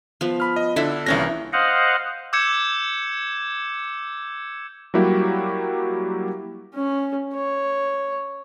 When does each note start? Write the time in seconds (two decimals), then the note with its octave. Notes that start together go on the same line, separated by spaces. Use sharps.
0.21 F3 B3
0.40 B5 F6
0.56 D#5
0.76 D3 D4 E4 A4
1.06 C2 E3 A#3 C#4 D4 A#6
1.53 C5 D#5 F5 F#5
2.33 D6 E6 G6 G#6 C#7 E7
4.94 F#3 G3 A#3 E4 F#4 G4
6.75 C#4
7.35 C#5